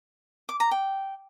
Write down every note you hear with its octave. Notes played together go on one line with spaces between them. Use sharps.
D6
A#5
G5